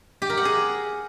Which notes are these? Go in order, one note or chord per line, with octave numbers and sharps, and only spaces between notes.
G4
A#4
F#5
G#4